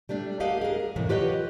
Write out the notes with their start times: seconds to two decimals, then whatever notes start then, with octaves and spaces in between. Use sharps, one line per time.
0.09 G3 A3 D4 D5
0.40 G4 A#4 D#5 F5 F#5
0.61 G#4 A#4
0.96 F2 A2 C3 E3
1.09 F4 G4 B4 C#5 D#5 F#5